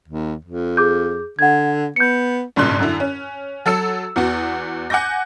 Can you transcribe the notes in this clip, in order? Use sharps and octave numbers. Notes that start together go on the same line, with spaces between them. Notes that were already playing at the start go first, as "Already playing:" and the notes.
D#2
F2
G#4 D6 G6
D3 F#5 G#6
B3 G6 C#7
G#1 G2 A#2 C#3 C6 F#6
F#2 D3 E4
C#4
F#3 A4 E6 C#7
E2 B3 F#4
F#5 G#5 D6 G6 A#6